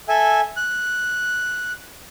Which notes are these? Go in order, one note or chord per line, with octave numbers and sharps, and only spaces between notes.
A4 E5 G#5
F#6